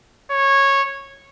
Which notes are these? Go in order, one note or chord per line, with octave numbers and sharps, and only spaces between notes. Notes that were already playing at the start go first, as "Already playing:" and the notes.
C#5